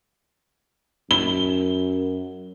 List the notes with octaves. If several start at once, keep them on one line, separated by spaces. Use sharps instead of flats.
F#2 G7